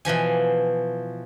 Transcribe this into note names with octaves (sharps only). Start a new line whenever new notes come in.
B2 E3 F3 G#5